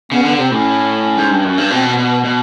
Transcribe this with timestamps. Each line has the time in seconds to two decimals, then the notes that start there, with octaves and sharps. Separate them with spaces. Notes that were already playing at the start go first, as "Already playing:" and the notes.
0.12 C#3 B3
0.25 D3 B3
0.38 C3 C4
0.51 A2 C#4
1.17 G#2
1.31 G2
1.44 F#2
1.58 G2
1.71 B2 C4
1.89 B3
1.97 B2
2.06 B3
2.24 B2